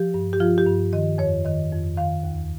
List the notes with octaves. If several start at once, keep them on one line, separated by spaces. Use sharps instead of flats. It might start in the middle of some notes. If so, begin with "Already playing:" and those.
Already playing: F3 G4
G2
G4
F3 F4
G4
G2
D#3 D#5
F2 C#5
D#3 D#5
F2
D#3 F5
D#2